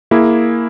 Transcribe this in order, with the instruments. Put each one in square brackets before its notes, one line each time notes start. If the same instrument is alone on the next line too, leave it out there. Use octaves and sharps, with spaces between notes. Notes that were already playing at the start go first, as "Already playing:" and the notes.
[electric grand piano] A#3 E4 G#4